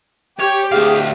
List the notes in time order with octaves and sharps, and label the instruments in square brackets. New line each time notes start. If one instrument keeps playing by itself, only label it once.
[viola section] G4 [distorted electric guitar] C#5
[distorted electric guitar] D2 F5 [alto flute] G#4